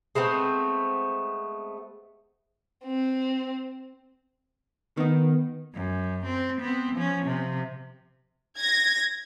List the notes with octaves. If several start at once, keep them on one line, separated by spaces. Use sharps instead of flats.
G#3 A3 B3 C4
C4
D#3 B3 D#4
F#2
C4
B3 C4
F3 C#4
C3 F3
G#6 A#6